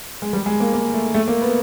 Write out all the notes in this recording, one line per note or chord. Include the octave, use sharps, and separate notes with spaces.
G#3
G3
G#3
A#3
A#3
A3
A3
A#3
B3